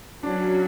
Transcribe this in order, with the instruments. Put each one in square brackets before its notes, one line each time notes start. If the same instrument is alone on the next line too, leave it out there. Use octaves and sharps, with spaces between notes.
[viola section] F#3 A#3 C#4 F#4 [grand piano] D4